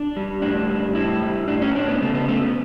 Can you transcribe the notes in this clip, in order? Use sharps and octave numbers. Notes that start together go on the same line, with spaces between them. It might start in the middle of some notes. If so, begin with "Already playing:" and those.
Already playing: D4
G3
A2 D4
G3
A2 E4
G3
A2 D4
C#4
A2 D4
B3
C#3 A3
B3
F#2 A3
B3